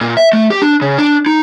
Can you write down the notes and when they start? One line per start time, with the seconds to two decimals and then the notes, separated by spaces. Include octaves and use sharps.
0.01 A#2
0.17 E5
0.33 A3
0.50 G4
0.62 D4
0.82 C#3
0.98 D4
1.26 D#4